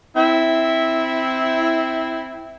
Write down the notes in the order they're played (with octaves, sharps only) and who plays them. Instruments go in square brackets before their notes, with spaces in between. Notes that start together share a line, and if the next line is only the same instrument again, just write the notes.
[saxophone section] C4 E4